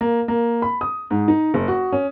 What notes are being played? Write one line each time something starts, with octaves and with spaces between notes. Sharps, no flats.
A#3
A#3
B5
D#6
G#2
D#4
F#1
F#4
C#4